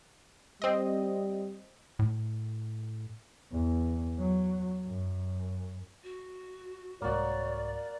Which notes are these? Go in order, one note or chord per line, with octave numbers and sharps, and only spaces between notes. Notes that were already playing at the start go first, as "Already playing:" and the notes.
G3 C4 D#5
A2
E2
F#3
F#2
F#4
C2 G#2 A#3 F#4 C#5 D5